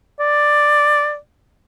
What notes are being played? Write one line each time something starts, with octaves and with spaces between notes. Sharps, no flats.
D5